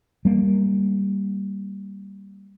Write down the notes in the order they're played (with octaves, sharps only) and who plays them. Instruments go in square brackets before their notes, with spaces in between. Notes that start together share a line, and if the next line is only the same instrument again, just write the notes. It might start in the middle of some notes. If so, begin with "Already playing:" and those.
[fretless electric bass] G3 A#3